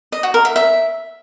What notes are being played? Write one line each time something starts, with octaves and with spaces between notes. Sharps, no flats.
D#5
F#4
A#4
E5
E5